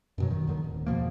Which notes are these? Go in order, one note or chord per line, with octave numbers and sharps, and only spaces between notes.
F#2 B2 F#3
D#3
D#2 D3 D#3
D1
E2 B2 F3 A#3